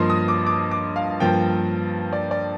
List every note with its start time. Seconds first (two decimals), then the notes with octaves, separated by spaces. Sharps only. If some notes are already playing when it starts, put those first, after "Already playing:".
Already playing: G2 F3 A#3 D#5 C6
0.10 D#6
0.28 D6
0.47 D6
0.71 D6
0.96 F5
1.20 G2 F3 A#3 G5
2.13 D5
2.31 D5